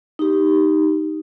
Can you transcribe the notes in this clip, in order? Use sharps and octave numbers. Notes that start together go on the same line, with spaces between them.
D#4 G4